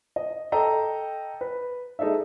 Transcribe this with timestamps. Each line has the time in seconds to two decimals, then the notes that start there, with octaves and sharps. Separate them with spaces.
0.16 D#5
0.52 A4 D#5 G5 A#5
1.41 B4
1.99 G#3 D#4 A4 D5 E5